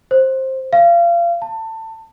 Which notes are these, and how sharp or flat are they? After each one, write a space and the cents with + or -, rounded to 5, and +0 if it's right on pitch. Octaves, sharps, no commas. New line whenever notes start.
C5 +15
F5 -30
A5 +25